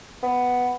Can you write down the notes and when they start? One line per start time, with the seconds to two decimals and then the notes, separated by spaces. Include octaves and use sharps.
0.23 B3